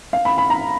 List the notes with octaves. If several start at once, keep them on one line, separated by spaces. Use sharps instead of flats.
F5
B5
B5
A#5